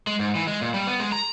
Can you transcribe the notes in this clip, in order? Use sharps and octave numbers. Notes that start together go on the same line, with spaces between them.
G#3
G#2
E3
G#3
A#2
G3
B3
G#3
A#5